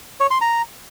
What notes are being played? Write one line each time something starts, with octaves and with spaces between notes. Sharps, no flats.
C#5
C6
A#5